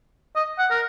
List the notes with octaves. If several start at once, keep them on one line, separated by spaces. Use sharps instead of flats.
D#5
F#5
A#4